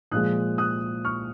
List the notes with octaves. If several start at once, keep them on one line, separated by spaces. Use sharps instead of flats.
A#2 F3 G#3 D#6 F#6
D#6 F#6
C#6 F6